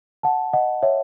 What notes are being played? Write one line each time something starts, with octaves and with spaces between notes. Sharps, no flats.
F#5 A5
D#5 F#5
C#5 E5